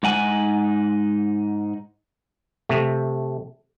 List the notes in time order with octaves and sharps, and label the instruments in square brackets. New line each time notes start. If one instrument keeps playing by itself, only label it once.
[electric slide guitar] G#2 D#4 F#5 G#5
[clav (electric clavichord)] C3 A3